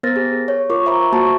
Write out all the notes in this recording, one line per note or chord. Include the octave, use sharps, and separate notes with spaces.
B3 A#4 C5 F6 A6 A#6
G4 G#4
C#5
F4 A#4 C#6 D6
C5 E5 A#5 B5 C#6
A#3 F#4 C5 A5 C#6